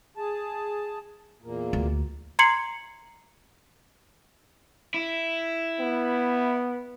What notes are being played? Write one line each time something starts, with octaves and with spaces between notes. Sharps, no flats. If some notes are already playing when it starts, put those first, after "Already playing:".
G#4 A5
E2 A#2 A#3
D2
A#5 C6 G#6 C7 C#7 F#7
E4
B3